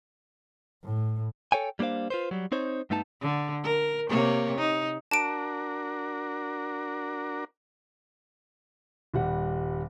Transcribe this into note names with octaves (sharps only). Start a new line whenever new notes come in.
A2
A4 C#5 G5 G#5
G3 A#3 D4 C5 F5
F4 B4 C5
F#3 G3
C4 D#4 C5 C#5
G2 A3 B3 D#4 A5
D3
A#4
C3 A#3 C#5
D#4
D4 F#4 A#4 A5 D7
D#1 G3 F#5